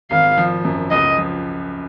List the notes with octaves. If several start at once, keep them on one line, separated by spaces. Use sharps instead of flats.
G#1 F5
F3
F#2
C#2 D#5
F3